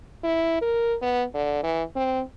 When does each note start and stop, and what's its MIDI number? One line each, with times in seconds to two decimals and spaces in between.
0.24 0.58 64
0.62 0.96 70
1.02 1.24 59
1.34 1.60 50
1.63 1.83 52
1.96 2.21 60